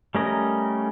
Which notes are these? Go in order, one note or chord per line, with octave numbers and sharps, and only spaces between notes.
G3 A3 C#4 A#4 D#5